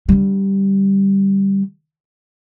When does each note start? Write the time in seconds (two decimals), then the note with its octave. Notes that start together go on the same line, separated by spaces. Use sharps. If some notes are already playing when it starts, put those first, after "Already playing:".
0.09 D3 G3